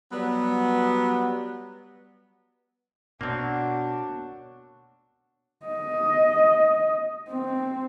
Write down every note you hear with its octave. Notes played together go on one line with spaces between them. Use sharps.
F#3 G3 B3
B2 A#3 C4 D4 F#4 C#5 C#6
D#5
C4